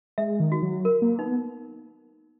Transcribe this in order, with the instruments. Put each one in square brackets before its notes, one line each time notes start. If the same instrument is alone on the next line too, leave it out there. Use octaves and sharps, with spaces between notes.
[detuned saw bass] G#3 [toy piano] E5
[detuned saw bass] D#3
[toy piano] F#4
[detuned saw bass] F#3
[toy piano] A#4
[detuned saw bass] A#3
[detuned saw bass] B3 [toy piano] D#4